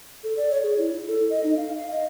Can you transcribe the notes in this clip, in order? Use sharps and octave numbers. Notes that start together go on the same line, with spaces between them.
A4
D5
C#5
G#4
E4
E4
A4
D#5
D#4
F5
F5
D#5